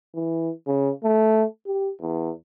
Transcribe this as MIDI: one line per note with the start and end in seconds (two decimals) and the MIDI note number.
0.15 0.50 52
0.67 0.91 49
1.04 1.44 57
1.66 1.91 67
2.01 2.31 40